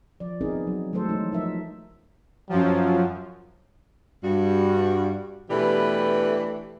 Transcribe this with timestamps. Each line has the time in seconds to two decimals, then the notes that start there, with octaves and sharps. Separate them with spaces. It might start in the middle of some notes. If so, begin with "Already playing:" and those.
0.20 F3 D5
0.41 B3 C4 D#4 G#4 A#4
0.67 F#3
0.93 F#3 G#3 A3 A4 C5
1.09 E3 A3 D#4
1.32 F3 D#4 A#4 E5
2.49 F#2 F3 F#3
4.23 G2 G3 F#4
5.50 B2 E3 A3 D4 G4 B4